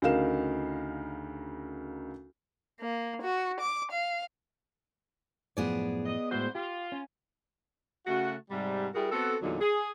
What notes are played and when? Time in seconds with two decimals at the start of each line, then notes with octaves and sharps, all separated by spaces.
0.02 D2 C#3 D#4 A#4 F5 E7
2.81 A#3
3.22 F#4
3.59 D6
3.90 F5
5.57 F#2 A2 F3 B3 G#4 D5
6.06 D#5
6.31 A2 E3 G#3 F#4 C5
6.55 F4 G4
6.92 C#4
8.07 C#3 A3 F#4
8.50 G#2 C3 G3
8.94 G3 E4 F#4 G#4 A#4
9.12 B3 C4 F#4 A4
9.42 E2 A#2 D3 F#3 D#4
9.60 G#4